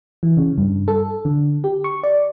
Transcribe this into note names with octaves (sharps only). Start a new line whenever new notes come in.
E3
C#3
G2
A4
D3
G4
C#6
D5